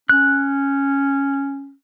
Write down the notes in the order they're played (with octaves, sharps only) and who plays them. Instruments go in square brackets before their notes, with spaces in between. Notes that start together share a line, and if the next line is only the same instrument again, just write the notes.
[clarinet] C#4 [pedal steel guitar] F#6